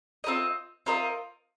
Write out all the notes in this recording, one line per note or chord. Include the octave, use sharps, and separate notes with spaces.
C4 F4 A#4 D#5
C4 F4 A#4 D#5